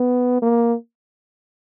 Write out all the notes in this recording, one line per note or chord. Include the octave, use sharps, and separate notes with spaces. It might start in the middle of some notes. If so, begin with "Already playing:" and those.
Already playing: B3
A#3